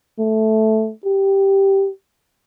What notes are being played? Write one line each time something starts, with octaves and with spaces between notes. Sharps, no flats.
A3
G4